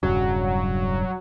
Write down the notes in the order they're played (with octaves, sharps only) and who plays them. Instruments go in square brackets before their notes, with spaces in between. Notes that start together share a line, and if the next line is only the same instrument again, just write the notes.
[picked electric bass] E1 G2 C#3 [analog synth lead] F#3